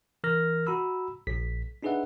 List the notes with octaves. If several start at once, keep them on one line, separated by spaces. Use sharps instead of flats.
E3 A#4 F6 A#6
F#4 A#5 B5 E6
A#1 B6
D4 D#4 G#4 B4 E5 F#5